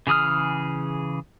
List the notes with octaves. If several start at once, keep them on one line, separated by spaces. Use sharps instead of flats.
C#3 E3 G#4 D#6 F6